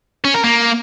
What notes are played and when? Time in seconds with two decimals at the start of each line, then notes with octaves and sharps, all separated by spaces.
0.25 C#4
0.34 A#4
0.44 A#3